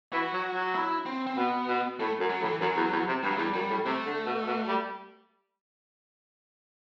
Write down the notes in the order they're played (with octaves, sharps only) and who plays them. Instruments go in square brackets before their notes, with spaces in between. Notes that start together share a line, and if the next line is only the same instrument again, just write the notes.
[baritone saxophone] E3 [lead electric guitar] F#4
[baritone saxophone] F#3
F#3
[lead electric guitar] E4
C4
C4
[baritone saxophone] B2 [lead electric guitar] B3
[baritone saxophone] B2
[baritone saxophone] A2 [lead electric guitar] A3
[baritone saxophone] F#2
[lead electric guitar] F#3
[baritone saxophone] A2
[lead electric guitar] E3
[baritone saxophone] F#2 [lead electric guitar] F#3
[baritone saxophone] E2
E2
C3
[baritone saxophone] G2 [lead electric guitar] G3
[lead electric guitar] F#3
[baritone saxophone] E2 [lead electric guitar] G3
[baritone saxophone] F#2 [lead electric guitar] G3
[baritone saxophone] A2
[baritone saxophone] C3 [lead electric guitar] A3
[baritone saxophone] D3
B2
B2
G3